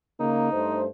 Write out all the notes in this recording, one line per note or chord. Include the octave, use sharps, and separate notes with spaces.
C#3 A#3 D#4
G2 A3 C5